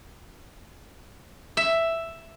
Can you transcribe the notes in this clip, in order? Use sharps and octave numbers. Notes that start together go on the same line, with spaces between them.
E5